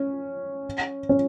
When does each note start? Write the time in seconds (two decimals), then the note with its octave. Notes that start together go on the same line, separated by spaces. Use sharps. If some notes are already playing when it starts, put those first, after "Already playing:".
Already playing: C#4
1.09 C#4